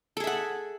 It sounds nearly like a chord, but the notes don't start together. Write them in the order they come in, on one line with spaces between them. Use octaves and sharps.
A4 G#4 E5 F#5